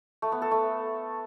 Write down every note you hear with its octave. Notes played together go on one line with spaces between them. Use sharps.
A3
B3
A4
A3